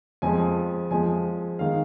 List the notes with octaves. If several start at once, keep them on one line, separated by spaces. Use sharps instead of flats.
F2 F3 G#3 G#5
F2 F3 G#3 G#5
D#3 G#3 F5